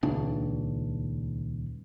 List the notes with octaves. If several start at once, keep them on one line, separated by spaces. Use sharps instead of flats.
D#1 C#2 D4